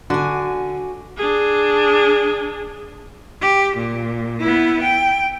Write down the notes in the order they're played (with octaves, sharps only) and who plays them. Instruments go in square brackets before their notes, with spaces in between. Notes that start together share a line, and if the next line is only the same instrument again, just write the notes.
[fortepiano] D3 [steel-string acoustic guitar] F#4 G#5
[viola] D4 G#4
[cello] G4
A#2
B3 E4
G5